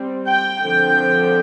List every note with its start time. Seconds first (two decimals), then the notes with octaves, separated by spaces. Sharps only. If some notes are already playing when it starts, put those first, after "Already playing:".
Already playing: G3 C4
0.27 G5
0.62 D3 F3 C4 G5